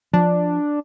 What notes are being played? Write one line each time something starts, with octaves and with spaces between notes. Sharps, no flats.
F3 D4